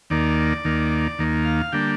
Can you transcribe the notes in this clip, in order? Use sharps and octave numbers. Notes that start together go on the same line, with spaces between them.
D#2 D#3 A#3 D5
D#2 D#3 A#3
D#2 D#3 A#3
F5
D3 G3 A#3 D4 G5